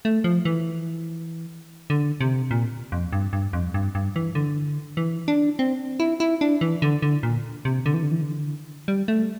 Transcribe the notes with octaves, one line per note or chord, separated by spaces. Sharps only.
A3
F3
E3
D3
C3
A#2
F2
G2
G2
F2
G2
G2
E3
D3
E3
D4
C4
E4
E4
D4
E3
D3
D3
A#2
C3
D3
E3
D3
E3
D3
G3
A3